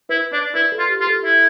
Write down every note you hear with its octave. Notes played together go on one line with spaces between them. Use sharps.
E4 B4
D4 D5
E4 B4
A4
F4
G4
F4
A4
E4